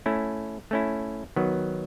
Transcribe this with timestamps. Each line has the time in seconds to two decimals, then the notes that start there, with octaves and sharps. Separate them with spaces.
0.06 A3 C#4 E4
0.71 A3 C#4 E4
1.36 D#3 F#3 B3